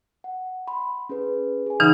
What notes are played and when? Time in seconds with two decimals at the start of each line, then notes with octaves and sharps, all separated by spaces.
0.24 F#5
0.68 B5 C6
1.09 C#4 G#4 B4
1.66 G#4 G#5
1.80 C#3 E3 D#4 F#5 B5 F#6